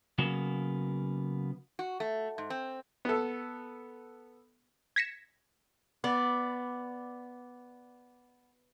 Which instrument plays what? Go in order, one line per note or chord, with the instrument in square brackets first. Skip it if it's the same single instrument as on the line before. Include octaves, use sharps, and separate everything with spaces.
[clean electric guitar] C#3 F#3 A#3 B3 C#4
[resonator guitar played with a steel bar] F#4
A3
G#2
C4
[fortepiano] B3 A4
[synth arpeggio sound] G#6 A#6 B6 C#7 E7
[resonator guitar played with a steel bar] B3 [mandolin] D5